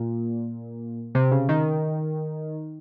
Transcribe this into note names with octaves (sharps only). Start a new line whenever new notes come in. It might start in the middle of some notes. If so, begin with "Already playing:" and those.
Already playing: A#2
C3
C#3
D#3